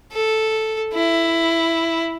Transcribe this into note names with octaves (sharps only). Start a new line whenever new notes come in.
A4
E4